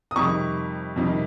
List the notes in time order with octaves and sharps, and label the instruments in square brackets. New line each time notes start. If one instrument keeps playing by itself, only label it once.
[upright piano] D#6
F2 C3 D#3 G3 C#6
F2 C3 D#3 G3